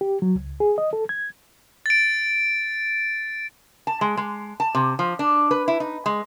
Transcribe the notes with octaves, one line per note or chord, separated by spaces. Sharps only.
G4
F#3
C#2
G#4
D#5
A4
G#6
A6 D7
A5
G#3
G#3
A5
C3
F3
D4
B4
E4
D#4
G#3